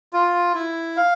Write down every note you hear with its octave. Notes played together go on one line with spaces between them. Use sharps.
F4
E4
F5